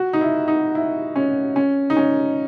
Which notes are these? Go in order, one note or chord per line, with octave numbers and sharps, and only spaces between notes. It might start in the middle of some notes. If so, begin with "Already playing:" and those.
Already playing: F#4
D#4
E4
D#4
E4
C#4
C#4
D#4
C#4